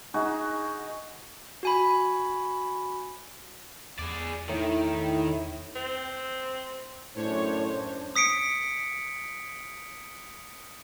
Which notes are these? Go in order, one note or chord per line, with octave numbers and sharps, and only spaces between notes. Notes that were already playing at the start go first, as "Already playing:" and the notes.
D#4 F#4 G#4
F#4 G#5 B5
E2 G#4 D5
A2 D#3 E4
C4
F#2 A2 D4 C5 C#5
D#6 B6 C#7 D7